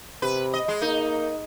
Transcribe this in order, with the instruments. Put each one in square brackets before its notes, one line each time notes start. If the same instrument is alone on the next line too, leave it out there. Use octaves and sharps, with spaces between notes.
[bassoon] C3 [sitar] B4
[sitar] D#5
G#3
[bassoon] A#3 [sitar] D#4